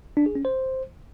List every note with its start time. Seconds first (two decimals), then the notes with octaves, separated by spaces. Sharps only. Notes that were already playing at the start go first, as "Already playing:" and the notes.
0.17 D4
0.26 G#4
0.35 C#4
0.45 C5